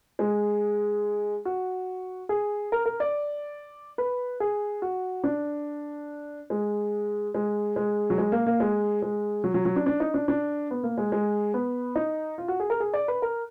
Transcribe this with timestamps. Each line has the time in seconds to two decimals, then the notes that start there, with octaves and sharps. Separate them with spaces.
0.19 G#3
1.45 F#4
2.29 G#4
2.72 A#4
2.86 A#4
3.00 D5
3.98 B4
4.40 G#4
4.82 F#4
5.24 D4
6.50 G#3
7.34 G#3
7.76 G#3
8.10 F#3
8.18 G#3
8.32 A#3
8.47 A#3
8.60 G#3
9.02 G#3
9.44 F#3
9.54 F#3
9.65 F#3
9.76 D4
9.86 D4
10.00 D#4
10.14 D4
10.28 D4
10.71 B3
10.83 A#3
10.98 G#3
11.12 G#3
11.54 B3
11.95 D#4
12.38 F4
12.48 F#4
12.60 G#4
12.70 A#4
12.80 G#4
12.94 D5
13.08 B4
13.22 A#4